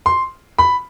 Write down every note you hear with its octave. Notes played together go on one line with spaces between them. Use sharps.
C6
B5